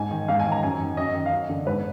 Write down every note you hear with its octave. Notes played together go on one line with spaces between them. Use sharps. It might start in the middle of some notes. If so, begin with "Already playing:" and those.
Already playing: G#2 G#5
D#3
G#2 F5
G#5
D#3
A#5
F#2 G#5
D#3
F#2 D#5
D#3
F5
F#2 D#5
D3
G#2 B4